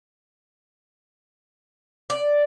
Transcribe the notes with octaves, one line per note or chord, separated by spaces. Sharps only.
D5